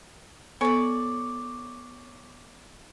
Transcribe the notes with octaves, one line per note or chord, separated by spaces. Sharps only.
B3 A4 C#5 D5 G#5